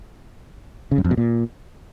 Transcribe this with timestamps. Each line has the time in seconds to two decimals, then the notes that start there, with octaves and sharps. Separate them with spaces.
0.92 C#3
0.98 F#2
1.05 F2
1.11 B2
1.17 A#2